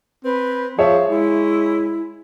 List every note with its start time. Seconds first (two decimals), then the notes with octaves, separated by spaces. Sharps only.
0.24 C4 B4
0.78 F3 G#4 C#5 E5 F5
1.09 G#3 E4